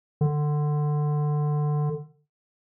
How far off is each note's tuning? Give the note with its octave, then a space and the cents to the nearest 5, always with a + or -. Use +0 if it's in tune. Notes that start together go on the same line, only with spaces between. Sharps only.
D3 +20